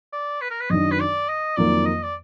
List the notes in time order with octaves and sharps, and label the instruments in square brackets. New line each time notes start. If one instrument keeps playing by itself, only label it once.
[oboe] D5
B4
A#4
B4
[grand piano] F#2 D#3 F#3 D4 [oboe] D#5
[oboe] B4
D5
D#5
[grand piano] F2 D#3 F#3 A#3 F4 [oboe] D5
[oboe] D#5
D5